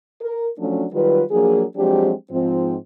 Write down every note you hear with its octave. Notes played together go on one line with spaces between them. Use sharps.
A#4
F3 F#3 A3 C#4 D4
D#3 F#3 G3 F4 B4
F3 F#3 A#3 D4 G#4
F3 F#3 G#3 C4 D4 G4
G#2 F3 C4